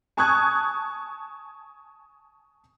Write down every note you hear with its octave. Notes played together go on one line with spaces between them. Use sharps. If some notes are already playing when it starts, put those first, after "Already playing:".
G#5 A5 C#6 D#6 F#6 G#6